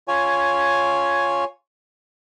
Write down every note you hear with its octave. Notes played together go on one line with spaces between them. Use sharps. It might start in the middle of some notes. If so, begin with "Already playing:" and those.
F4 C#5 G#5